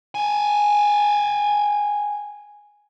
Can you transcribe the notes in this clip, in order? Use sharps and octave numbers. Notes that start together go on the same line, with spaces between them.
G5 G#5